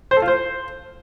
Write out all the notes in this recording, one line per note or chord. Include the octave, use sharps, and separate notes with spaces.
C5
A4
F4
C5